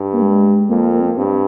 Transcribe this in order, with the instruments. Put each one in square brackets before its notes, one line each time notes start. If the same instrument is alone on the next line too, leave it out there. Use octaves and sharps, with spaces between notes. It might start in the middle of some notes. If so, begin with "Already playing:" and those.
Already playing: [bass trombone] G2
[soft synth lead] A#3
G#3
[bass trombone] F2 [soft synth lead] A#3
[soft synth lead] A#3
C4
A#3
[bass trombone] G2 [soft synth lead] C4